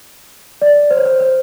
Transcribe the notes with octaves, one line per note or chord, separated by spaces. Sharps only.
D5
C5
C#5
C5
C5